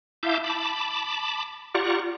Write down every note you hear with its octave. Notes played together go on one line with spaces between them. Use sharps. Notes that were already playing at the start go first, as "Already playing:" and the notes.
E4 E5 F5 A5 D6 G6
A5 B5 D6
F4 G4 D5 F#5 A#5 C#6